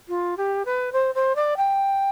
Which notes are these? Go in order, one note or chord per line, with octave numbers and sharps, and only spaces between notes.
F4
G4
B4
C5
C5
D5
G5